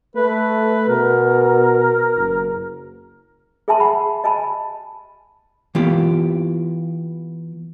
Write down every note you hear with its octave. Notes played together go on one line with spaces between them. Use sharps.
A3 B4
B2 A#4
F#1
G#4 E5 G#5 A5 C6
F#5 A5 B5
D#5 G#5 A5 B5
E3 A#3 B3 F4 G4